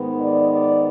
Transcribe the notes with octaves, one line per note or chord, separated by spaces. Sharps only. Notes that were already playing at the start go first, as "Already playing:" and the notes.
Already playing: G#2 D#3 B3
D5
D5